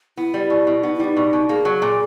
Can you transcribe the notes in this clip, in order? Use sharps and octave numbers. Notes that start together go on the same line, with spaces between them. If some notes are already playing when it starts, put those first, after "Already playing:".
B3 E4
G3
B2
B2
B3 D#4
E4
G3 D#4
B2
B2
A#3 G#4
F#3
A#2